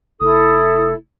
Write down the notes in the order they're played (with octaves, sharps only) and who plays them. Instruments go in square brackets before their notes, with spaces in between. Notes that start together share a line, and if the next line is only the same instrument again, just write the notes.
[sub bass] F1 [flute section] E4 A4 [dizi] D#6